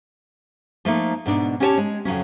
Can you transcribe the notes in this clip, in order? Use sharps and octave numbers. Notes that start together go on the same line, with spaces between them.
F3 A3 A#3 D#4
G#2 B2 D4 D#4
C#4 D4 G4 A4 C#5 A5
G#3
F2 C#3 F#3 C#4